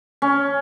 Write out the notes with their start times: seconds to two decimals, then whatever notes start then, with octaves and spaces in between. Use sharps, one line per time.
0.22 C#4